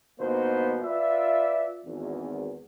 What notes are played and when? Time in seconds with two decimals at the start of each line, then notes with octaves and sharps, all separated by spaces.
0.18 G1 B2 A#3 B3 D#4 C5
0.82 F4 B4 D5 E5
1.84 G#1 E2